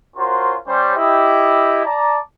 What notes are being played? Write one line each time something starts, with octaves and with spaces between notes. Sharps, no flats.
C#4 F4 F#4 A#4 C5 C6
G3 C#4 C5
E4 G4 D#5
D5 A5 A#5